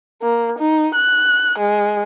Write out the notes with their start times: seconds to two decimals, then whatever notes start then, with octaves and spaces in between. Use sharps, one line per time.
0.22 A#3
0.58 D#4
0.95 F#6
1.58 G#3